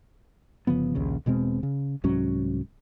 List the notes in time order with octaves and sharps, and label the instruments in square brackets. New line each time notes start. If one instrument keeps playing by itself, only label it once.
[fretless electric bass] G1 C#3 F3 B3
A#1 D#2 C#3
E1 B2 G#3 C4
C#3
C2 G#2 F#3 C#4